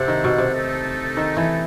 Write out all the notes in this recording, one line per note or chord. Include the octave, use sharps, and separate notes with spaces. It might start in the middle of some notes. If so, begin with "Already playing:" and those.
Already playing: C3 E4 A4 C5 F#5
D#3
B2
C3
A3 D#4 A4
D#3
E3